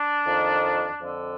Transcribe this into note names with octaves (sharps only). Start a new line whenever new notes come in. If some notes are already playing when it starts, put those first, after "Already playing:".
Already playing: D4
F2 D#3
F2 D3